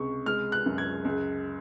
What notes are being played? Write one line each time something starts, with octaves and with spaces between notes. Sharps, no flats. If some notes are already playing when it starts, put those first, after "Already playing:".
Already playing: C#2 C3 C#6
G#3 F6
F#6
F#2
G#6
C#2